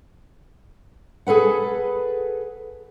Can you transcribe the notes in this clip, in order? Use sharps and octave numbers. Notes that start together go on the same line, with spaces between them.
G#4 A4 B4 F#5